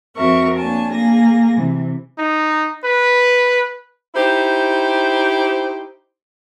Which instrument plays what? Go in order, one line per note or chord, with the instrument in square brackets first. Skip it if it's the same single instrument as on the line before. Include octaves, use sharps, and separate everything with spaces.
[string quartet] F2 C4 F#4 A#4 E5 C#6
A#3 D4 C#5 G#5 A5
A#3 G#4 G#5 A#6
C3 E3
[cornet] D#4
B4
[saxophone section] D#4 E4 G4 C5